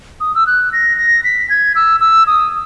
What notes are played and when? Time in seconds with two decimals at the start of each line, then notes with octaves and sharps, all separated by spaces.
0.20 D#6
0.35 E6
0.47 F#6
0.73 A#6
0.98 A#6
1.24 B6
1.50 G#6
1.75 E6
2.00 E6
2.27 D#6